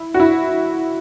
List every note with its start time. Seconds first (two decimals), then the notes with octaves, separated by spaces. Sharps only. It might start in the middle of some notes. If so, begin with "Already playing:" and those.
Already playing: E4
0.14 F#4
0.20 E4